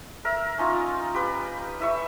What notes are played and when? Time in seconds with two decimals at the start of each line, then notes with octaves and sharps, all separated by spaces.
0.25 A#4 E5
0.58 C#4 D#4 F4
1.14 G4 B4
1.80 E4 E5 C#6